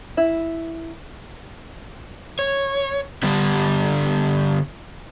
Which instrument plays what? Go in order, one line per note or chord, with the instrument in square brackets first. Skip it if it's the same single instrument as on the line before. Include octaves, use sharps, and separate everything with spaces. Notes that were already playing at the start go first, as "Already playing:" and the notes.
[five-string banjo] E4
[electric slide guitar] C#5
D3 G3 B3 D4